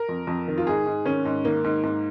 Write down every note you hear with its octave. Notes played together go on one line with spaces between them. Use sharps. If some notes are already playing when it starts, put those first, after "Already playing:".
Already playing: A#4
F2
F2
D#3
F4
G#2 G#4
G#2
D#3 C#4
G#2
D#3 A#3
G#2
G#2